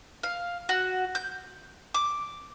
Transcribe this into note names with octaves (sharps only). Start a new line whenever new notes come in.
F5
F#4
G6
D6